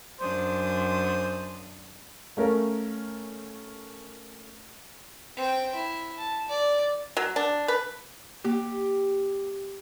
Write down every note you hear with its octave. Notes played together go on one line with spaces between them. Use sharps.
F#2 D4 C5 D#6
A3 C#4 A#4 F5
C4 G5
E4
A5
D5
F#3
D4
B4
A#3 G4